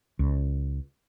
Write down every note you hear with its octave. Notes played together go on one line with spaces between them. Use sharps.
C#2